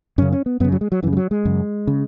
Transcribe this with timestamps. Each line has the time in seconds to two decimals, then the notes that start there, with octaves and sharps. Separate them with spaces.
0.18 F#2 C#3 C#4
0.32 C#4
0.46 B3
0.60 F#2 C#3 B3
0.72 F#3
0.81 G#3
0.92 F#3
1.03 F#2 C#3 E3
1.13 G#3
1.17 F#3
1.31 G#3
1.45 F#2 C#3
1.87 C#3